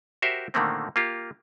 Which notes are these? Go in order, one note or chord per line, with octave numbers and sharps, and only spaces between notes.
F#4 G4 A#4 C5 E5
A#2 D3 D#3 A3 A#3 C4
A#3 F4 G4